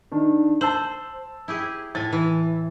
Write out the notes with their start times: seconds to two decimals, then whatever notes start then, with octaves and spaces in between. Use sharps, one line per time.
0.12 D#3 D4
0.61 C5 A5 E6 F#7
1.48 E4 G4 G#4
1.95 A2 G#5 A6
2.12 E3